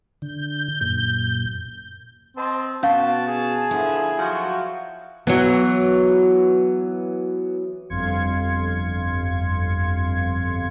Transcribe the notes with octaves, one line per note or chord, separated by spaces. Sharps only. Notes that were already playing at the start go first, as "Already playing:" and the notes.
D3 G6
F#2 A#2
C4 C5 D#5 A5
B2 C#4 F#4 F5 G5 A5
G#4
D3 F3 B3 E4
F3 F#3 F#4
E3 F#3 B3
G1 F2 F5 C6 G#6 C#7